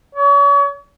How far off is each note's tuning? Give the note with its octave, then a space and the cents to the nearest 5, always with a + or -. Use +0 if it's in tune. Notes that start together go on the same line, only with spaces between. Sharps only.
C#5 +40